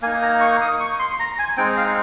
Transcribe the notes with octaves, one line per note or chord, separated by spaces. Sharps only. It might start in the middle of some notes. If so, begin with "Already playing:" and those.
A#3 D#4 G#5
A#5
C#6
D#6
C#6
C6
A#5
G#5
G#3 C4 D#4 G5
F5